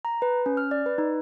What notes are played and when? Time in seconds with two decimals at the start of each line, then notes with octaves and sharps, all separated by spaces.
0.05 A#5
0.22 B4
0.46 C#4
0.57 F6
0.71 D5
0.86 B4
0.98 D#4